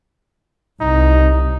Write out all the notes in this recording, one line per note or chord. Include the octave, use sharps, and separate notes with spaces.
C2 D#4